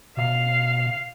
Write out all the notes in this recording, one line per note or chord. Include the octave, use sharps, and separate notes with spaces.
B2 F5